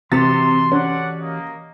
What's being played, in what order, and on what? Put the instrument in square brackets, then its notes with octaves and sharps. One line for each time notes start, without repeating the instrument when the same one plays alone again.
[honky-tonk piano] C3 A6 [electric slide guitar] E3 F#4 G4 [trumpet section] C6
[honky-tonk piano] C#4 [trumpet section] A4 D5 F#5
[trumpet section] A#3 D#5